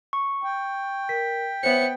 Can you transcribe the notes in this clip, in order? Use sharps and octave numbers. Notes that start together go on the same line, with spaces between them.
C#6
G5
A#4 B6
B3 C5 C#5 E5 C#7